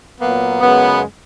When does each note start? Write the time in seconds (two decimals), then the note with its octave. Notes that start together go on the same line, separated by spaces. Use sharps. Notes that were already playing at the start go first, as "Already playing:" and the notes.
0.18 A#2 F#3 A#3 B3
0.61 F#2 C#3 G#3 B3